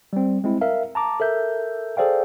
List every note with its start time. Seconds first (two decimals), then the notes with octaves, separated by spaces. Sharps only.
0.13 G3 C4
0.44 G#3 C4 E4
0.61 A#4 E5 F5
0.95 A5 A#5 D6
1.20 A4 A#4 E5 G6
1.97 G#4 A4 C5 D5 F5 G5